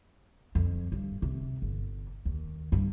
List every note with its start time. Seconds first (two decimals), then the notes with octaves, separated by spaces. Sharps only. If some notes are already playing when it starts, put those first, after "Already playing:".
0.55 F2
0.92 G2
1.22 C3
1.62 G1
2.25 D#2
2.72 G2